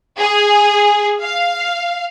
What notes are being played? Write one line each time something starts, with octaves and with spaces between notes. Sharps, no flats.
G#4
F5